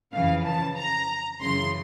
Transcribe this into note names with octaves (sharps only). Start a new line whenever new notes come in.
F2 C#3 E3 F5
A5
A#5
F#2 C#3 E3 C6